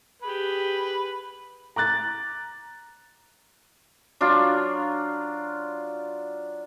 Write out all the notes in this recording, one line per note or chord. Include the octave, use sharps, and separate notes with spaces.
G4 G#4 B4
A#5 D6 F#6 A6
F#3 D4 F4